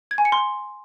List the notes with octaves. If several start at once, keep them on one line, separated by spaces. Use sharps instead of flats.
G#6
G#5
C#7
C6